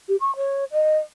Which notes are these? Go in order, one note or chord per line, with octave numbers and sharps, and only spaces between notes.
G4
C#6
C#5
D#5